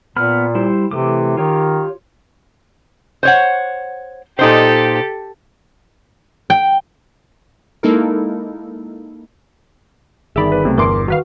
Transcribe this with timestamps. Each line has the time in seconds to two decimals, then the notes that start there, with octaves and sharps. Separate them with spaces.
0.16 A#2 B3 B5 F6
0.55 G3 E4 C5
0.91 C3 E3 A3 D6
1.37 D#3 F4 G4 C#5
3.23 C5 C#5 F#5
4.39 A#2 D#4 G4 A4 C5
6.50 G5
7.83 G#3 A#3 D#4 E4 A4 A#4
10.36 G1 D#3 G#4 D5 E5 B5
10.52 B4
10.65 B1 C3 A3
10.78 G1 E2 G2 E3 A#4 C6 D6
11.08 D#3 F#4 B4 F5